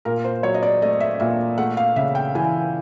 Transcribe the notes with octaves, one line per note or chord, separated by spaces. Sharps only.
A#2 A#4
C5
F#3 C#5
D#5
D5
A3 D#5
E5
A#2 E5
A3 F#5
F5
C#3 E5
G5
E3 G#5